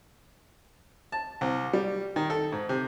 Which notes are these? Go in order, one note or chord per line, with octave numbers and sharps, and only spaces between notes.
A5
C2
G3
D#3
A4
G#2
C3